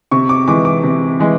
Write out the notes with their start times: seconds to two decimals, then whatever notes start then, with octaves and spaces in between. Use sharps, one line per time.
0.11 C3 C#6
0.29 D6
0.48 E3 G#3 D6
0.65 D6
0.83 C3
1.20 E3 G#3